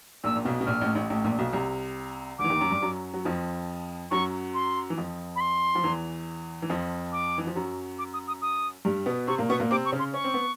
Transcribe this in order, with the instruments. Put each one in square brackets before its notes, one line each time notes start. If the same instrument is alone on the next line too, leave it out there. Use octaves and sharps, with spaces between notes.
[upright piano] A#1 A#2 [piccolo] E6
[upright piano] A#2
B1 B2
B2
[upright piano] A#1 A#2 [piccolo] F6
[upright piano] A1 A2
A1 A2
A1 A2
A#1 A#2
B1 B2
C2 C3
[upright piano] D2 D3 [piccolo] D6
[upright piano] E3
D#2 D#3
F#2 F#3
G2 G3
F#2 F#3
F#3
F2 F3
[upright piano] F#2 F#3 [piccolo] C#6
[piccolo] C6
[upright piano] E3
F2 F3
[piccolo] B5
C6
[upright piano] F3
E2 E3
E3
F2 F3
[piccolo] D6
[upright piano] E3
F3
F#2 F#3
[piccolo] D6
D#6
D#6
D#6
[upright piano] G2 G3
B2 B3
[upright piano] C3 C4 [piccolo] C#6
[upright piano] A#2 A#3
[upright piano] B2 B3 [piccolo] C#6
[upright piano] A#2 A#3
[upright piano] C3 C4 [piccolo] D6
[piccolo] C#6
[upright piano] C#3 C#4
[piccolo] C6
[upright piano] C#4 [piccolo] C#6
[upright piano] C4
B3